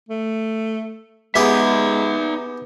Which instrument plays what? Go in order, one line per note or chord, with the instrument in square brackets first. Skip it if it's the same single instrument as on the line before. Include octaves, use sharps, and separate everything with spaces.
[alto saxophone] A3
[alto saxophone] G#3 [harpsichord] B3 G4 G#4 [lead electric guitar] D#4 E5